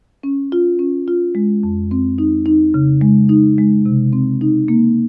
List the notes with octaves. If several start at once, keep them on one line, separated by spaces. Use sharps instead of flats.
C#4
F4
C#4
F4
G#3
F2
C4
D#4
D#4
C#3
G#3
D#4
G#3
C3
C4
D#4
A#3